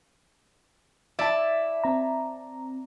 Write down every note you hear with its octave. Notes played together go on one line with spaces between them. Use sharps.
E4 D5 E5 A5
C4 A#5